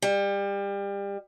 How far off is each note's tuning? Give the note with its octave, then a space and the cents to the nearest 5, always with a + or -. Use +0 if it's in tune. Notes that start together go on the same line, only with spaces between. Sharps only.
G3 +30